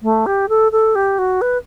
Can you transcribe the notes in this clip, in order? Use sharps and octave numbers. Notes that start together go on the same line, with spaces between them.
A3
G4
A4
A4
G4
F#4
B4